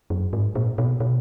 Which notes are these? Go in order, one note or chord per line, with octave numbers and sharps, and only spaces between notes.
F#2
G#2
A#2
B2
B2